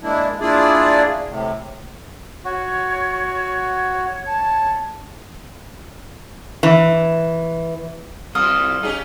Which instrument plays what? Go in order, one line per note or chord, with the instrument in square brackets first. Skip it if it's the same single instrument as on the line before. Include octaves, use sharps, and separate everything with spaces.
[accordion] G#3 A#3 D4 E4
A#3 D4 E4 F4 G#4 D5
A2 C3
[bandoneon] F#4 [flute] C#5
[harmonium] A5
[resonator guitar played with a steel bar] E3
[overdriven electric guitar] G3 C4 [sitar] F4 [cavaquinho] D#6 [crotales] F6
[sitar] C#4 G4 G#4 [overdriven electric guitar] D#4